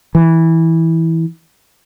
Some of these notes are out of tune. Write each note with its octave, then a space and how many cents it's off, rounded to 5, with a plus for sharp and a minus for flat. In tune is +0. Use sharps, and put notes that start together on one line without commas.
E3 -15